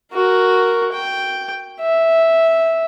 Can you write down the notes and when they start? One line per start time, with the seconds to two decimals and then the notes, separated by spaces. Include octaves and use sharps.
0.13 F#4 A#4
0.92 G5
1.81 E5